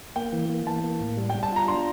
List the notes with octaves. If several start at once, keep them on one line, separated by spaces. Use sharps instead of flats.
A#3 G5
E3
A#3
E3 A5
A#3
A2
G3
G3 G5
A5
F4 A#5
D4 C6